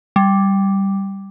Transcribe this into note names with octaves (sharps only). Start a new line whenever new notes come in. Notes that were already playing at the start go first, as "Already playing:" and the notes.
G3